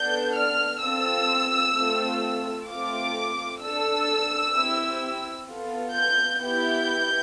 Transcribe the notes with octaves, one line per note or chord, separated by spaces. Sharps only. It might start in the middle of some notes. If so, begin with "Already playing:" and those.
Already playing: B3 D4 A4 G6
F6
C4 F4 A4 E6
A3 C4 F4 A4
A3 C4 F4 D6
D4 A4 E6
C4 E4 G4
B3 F4 A4
G6
B3 E4 G4 G6